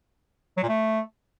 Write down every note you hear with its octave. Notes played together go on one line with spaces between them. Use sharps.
F#3
A#2
A3